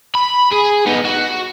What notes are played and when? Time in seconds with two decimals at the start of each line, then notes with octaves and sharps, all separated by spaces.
0.15 B5
0.52 G#4
0.87 B3 D#4
1.05 F#4